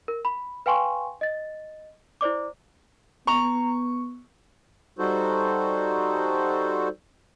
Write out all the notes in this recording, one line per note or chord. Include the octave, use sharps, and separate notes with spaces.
A#4
B5
B4 F5 G5 G#5 C6 C#6
D#5 A6
E4 C5 D5 D6
B3 A#5 C#6
G3 D#4 F#4 A4 C5